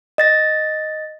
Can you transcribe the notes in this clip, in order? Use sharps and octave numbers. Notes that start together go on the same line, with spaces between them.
D#5 A6 A#6